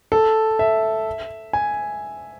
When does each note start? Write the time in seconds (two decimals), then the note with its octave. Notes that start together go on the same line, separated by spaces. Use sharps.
0.12 A4
0.59 E5
1.53 G#5